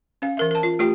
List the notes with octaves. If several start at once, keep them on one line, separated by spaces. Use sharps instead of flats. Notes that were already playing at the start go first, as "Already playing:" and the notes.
C#4 F5
E3 A#4 E5
A#4 A5
F4
A3 F4 G4 G5